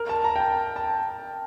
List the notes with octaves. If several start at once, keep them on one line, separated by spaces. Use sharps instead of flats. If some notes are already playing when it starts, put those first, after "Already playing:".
Already playing: A#4
A5
A#5
G5
A5
A5